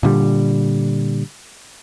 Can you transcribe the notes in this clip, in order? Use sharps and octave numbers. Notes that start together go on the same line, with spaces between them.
A#2 D3 G3